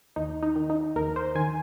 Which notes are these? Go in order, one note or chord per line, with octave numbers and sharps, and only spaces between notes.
D#2 D#4
D#4
D#3
D#4
D#2 A#4
C5
D#3 G#5